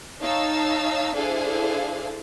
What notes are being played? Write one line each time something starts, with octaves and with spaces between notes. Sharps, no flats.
D#4 C#5 F5 A5 E6
D4 E4 G#4 A4 C5 F5